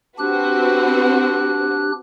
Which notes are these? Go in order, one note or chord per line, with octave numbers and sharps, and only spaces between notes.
C4 D4 F#4 G4 B4 F#6